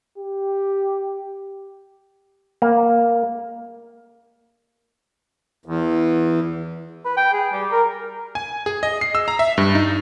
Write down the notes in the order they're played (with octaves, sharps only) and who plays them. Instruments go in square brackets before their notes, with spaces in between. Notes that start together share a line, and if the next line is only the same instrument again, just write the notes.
[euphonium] G4
[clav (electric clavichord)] A#3
[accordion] E2
[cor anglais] B4
G5
G#4
G3
A#4
[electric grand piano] G#5
G#4
D#5
C7
E6
A#5
E5
G2
D#4